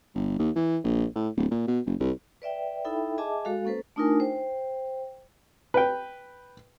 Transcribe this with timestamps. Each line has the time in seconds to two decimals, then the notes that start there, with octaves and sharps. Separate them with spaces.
0.15 G1
0.39 D#2
0.56 E3
0.84 A#1
1.16 A2
1.37 D1
1.51 A#2
1.68 B2
1.86 F#1
2.00 C2
2.42 B4 D5 E5 G5
2.84 D#4 E4 A4 E5 G5 B5
3.18 G#4 D#5 E5 G#5 A5 D6
3.45 G#3 F#4 A4 F5
3.65 A#3 C#4 A4 B4 C5
3.96 A3 D4 D#4 F4 A#4 G#5
4.20 C5 G5
5.74 B4 G5